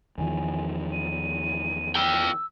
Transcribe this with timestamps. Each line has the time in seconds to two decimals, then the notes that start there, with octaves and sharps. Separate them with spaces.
0.18 E2 D#3 F3 G#5
0.92 D#7
1.96 F4 G5 E6